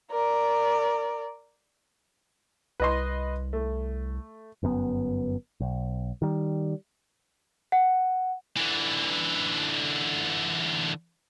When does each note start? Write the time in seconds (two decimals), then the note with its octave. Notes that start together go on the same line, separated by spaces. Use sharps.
0.11 A#4 D5
2.80 C2 B4 D#5 C6
3.53 A3
4.63 G1 F#2 C3 B3
5.60 B1
6.22 D#3 G3
7.72 F#5
8.57 D3 E3